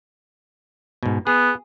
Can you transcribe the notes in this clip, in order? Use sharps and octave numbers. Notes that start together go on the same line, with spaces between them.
G#2 B2
B3 G#4